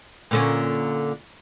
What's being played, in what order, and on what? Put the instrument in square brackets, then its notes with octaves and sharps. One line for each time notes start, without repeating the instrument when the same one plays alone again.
[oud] A#2 D3 C#4